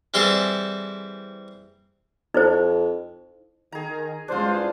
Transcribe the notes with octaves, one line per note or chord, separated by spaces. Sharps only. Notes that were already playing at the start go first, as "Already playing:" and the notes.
E3 G3 C4 E4 G#4 A4
F2 D#4 E4 C5
D#3 G#4 A#5
C#2 E3 G3 G#3 D4 F4 C5